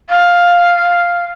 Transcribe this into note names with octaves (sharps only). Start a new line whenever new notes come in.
F5